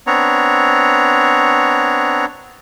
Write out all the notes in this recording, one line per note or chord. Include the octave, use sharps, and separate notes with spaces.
B3 C4 D4 C#5 A#5